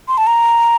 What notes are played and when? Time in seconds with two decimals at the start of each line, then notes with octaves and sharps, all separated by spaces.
0.08 C6
0.18 A5
0.27 A#5